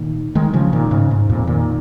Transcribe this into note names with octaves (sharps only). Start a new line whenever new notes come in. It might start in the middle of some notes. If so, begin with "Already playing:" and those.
Already playing: A#2 D#3
D#3 G#3
C#3 F3
A#2 D#3
G#2 C#3
G#2
F2 A#2
A#2 D#3